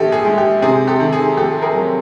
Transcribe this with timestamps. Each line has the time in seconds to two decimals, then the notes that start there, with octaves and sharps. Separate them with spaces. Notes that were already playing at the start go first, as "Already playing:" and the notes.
Already playing: A#1 D#3 G4 A4
0.12 G#4
0.25 G#3
0.38 G4
0.62 C3 G#4
0.87 G4 A4
1.00 D#3
1.12 G#4
1.37 F2 G4 A4
1.62 G#4 A#4
1.75 F#3